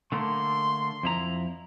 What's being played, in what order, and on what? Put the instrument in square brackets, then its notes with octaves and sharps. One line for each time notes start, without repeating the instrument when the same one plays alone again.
[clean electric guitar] D3 A3 A#3 [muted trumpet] C6
[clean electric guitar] F2 E4 A#5